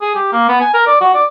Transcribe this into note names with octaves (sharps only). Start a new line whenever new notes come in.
G#4
G4
A#3
B3
G#5
A#4
D5
F#4
D5